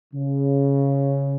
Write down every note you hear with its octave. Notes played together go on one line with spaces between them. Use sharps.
C#3